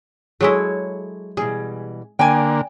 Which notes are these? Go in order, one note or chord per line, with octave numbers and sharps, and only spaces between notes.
F#3 G#3 E4 G#4 A4 C#5
B2 E3 G3 G#4
D3 A#3 D5 G5 G#5